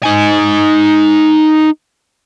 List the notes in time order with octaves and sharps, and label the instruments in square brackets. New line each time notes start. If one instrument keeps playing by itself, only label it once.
[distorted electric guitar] D#4 G#5